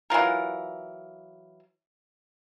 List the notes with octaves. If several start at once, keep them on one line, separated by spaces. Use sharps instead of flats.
E3 F#3 F4 A#4